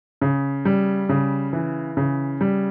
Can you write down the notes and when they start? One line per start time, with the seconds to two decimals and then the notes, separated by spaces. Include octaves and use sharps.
0.22 C#3
0.65 G3
1.09 C#3
1.53 E3
1.97 C#3
2.41 G3